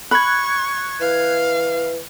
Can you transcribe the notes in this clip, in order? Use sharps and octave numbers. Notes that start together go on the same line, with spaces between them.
B5 C#6 F#6 G#6
E3 F5